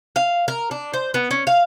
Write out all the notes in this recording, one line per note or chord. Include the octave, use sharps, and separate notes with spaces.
F5
A#4
D4
C5
B3
C#4
F5